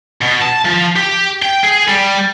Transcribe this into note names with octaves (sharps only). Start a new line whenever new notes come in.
B2
A5
F3
G4
G5
G#4
G3